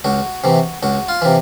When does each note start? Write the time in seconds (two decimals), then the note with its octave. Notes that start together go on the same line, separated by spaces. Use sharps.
0.04 C#2 F#4
0.44 C3 E3
0.83 C#2 F#4
1.09 F4
1.22 C3 E3